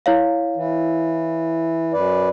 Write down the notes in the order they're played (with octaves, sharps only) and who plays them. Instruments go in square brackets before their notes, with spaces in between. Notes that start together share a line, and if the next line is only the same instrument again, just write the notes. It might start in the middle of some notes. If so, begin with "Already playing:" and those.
[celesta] E4 C#5 F5
[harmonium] E3
F#2 B4 D5